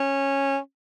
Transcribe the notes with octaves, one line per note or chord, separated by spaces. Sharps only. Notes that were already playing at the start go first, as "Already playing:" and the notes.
Already playing: C#4